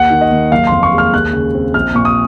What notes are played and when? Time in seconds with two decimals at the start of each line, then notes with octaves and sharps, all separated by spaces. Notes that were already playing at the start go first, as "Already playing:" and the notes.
Already playing: D#2 F#5
0.10 D#3
0.21 D#5
0.31 D#2
0.51 F#1 F5
0.67 F2 C6
0.83 C#6
0.93 G#3
0.98 F6
1.13 D#2 F#6
1.33 C#3
1.55 C4
1.74 A#1 F6
1.95 A#2 C#6
2.05 D#6